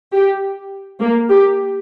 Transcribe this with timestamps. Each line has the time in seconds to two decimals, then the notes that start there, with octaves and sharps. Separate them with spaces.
0.13 G4
1.00 A#3
1.29 G4